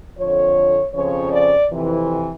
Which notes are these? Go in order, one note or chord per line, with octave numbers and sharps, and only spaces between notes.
F2 D3 F3 C#5
F2 C#3 F3 C#5
D5
F2 C3 E3